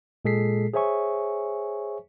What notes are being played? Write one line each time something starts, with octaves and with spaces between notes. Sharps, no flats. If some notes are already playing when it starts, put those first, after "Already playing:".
A#2 G#3 G#4 A4 B6 C7
G#4 C5 C#5 E5 G#5 C#6